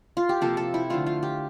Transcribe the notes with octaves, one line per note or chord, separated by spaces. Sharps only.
F4
G4
C3 F3 A#3 A4
A4
E4
D3 F3 A3 F4
F4
G4